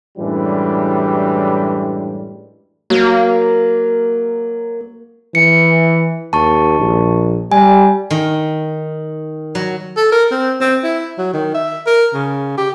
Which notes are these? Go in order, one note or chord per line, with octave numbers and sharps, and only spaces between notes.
F#2 A2 E3 G3 G#3 D4
F#3 A#3
E3 C#7
D#2 A5 C#6
A#1
G3 G#5
D#3
F#3
A4
A#4
C4
C4
E4
F#3
D#3
E5
A#4
C#3
G4